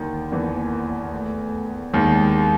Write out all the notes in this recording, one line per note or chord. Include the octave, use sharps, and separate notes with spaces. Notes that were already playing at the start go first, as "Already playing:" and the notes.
Already playing: D#2 D3 D#3
E2 E3 A#3
A3
D#2 D#3 G#3